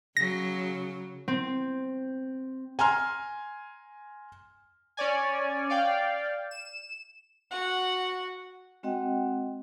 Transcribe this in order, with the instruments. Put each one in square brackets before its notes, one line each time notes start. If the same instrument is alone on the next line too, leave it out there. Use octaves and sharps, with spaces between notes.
[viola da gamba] C#3 F#3 [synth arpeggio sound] A#6
[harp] C4
[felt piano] G#5 A#5 C6 F6
[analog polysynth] C#4 C#5 D5 G#5
D5 F5 G5
E7
[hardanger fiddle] F#4 F#5
[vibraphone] G#3 C4 F#4 D#5 F#5 G5